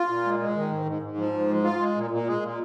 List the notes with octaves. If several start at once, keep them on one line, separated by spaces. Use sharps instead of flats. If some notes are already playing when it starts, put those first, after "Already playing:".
Already playing: F4
A#2
G#3
G#3
D#3
G#2
G#2
G#2
F3
G#2
G#3
F4
G#3
A#2
A#2
G#3
A#2